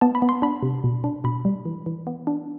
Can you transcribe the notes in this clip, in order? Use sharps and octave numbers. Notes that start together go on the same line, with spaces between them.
B3 A5
B5
B3
C6
D4 B5
C3
B2
D4
B2 B5
G3
E3
E3
B3
D4